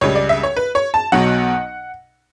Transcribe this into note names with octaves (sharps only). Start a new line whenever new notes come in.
C#2 C#3 G3 C#5
D5
E5
C#5
B4
C#5
A5
B1 B2 F#3 F#5